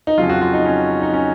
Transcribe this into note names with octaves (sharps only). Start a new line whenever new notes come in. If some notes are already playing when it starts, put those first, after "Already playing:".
D#4
F2 C#3 F#3 F4
F#4
F4
D#4
C#4
D#4
C#4